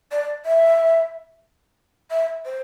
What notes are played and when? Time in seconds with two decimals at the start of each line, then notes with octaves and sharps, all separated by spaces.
0.12 D5
0.45 E5
2.11 E5
2.45 C5